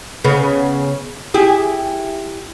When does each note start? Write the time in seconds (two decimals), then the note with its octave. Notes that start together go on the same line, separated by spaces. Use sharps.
0.25 C#3 B3
1.34 E4 G4 G#4